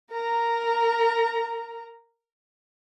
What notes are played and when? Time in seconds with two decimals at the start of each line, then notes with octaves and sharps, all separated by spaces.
0.11 A#4 A#5